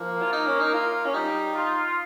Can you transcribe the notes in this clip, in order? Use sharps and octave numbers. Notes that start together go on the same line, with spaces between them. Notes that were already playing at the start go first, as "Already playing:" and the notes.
Already playing: F3 A#3 A#4
F4
D#4
C#4
D#4
F4
C#4
G3 D#4 G4
F4